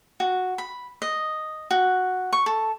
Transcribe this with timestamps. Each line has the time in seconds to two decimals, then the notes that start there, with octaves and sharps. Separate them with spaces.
0.20 F#4
0.58 B5
1.02 D#5
1.71 F#4
2.33 C#6
2.46 A4